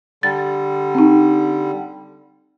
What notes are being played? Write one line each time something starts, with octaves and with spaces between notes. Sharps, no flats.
D3 G3 A6
C4 D#4